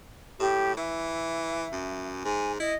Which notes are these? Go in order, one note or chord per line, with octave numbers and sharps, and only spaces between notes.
A2 G4
E3 E5
F#2
G#2 G#5
E4 D#5